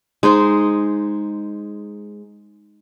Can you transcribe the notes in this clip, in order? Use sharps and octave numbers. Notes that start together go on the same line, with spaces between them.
G#3 D#4 C5